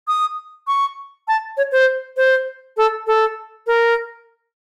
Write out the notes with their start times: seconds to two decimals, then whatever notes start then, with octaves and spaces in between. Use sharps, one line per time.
0.08 D#6
0.67 C#6
1.28 A5
1.57 C#5
1.72 C5
2.17 C5
2.77 A4
3.07 A4
3.67 A#4